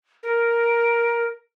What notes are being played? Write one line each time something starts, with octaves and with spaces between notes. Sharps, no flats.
A#4